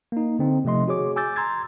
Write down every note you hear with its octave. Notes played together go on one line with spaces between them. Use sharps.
A#3 D#4
D3 C4 D#4
C3 F3 A3 D#5 C6
F#4 G#4 C#5 D6
G#5 D6 E6 G6 A6
A#5 C6 E6 G#6 A6